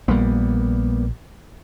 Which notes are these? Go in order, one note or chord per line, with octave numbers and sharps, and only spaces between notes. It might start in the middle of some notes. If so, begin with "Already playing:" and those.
A#1 G3 A#3 B3